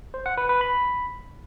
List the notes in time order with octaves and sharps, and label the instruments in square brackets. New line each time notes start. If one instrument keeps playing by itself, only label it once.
[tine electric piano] C5
F#5
B4
B4
B5